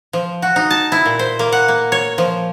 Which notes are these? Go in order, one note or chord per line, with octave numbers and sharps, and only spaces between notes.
F3
F#4
D#4
A5
E4
A#2
C5
A#3
F#5
A#3
C#5
F3